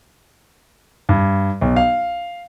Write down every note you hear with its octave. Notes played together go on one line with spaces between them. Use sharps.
G2
B1
F5